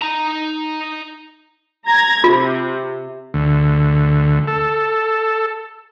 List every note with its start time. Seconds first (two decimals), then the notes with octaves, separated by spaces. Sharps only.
0.02 D#4 A#5
1.88 A#5 G#6 A#6
2.24 C3 F4
3.34 D2
4.47 A4